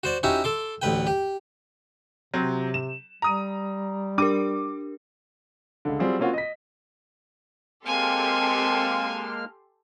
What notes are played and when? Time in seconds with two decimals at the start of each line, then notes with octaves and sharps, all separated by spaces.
0.03 F#4 C5 D5
0.23 C#4 D#4 E4 F#4 G4
0.44 A4 C6 D6
0.82 A1 D2 B4 G5
1.07 G4
2.34 C3 F#3 C4
2.74 E7
3.22 G3 A#5 D#6 D#7
4.18 D4 G4 A#4 D6 D#7
5.85 C#2 D3
5.99 F#3 G3 C4 F4 G#4
6.19 A#3 C4 C#4 F4 F#4
6.33 D#5 B6
7.85 G#3 A#3 C4 G4 A4 G#5 C6 F6